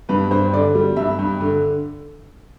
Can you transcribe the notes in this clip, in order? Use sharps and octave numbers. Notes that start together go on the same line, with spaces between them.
G2 B4
G2 C5
D3 D5
G3
G2 E5
G2
D3